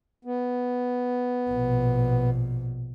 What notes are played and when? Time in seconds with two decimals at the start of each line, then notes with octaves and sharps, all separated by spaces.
0.25 B3
1.50 A#1 B2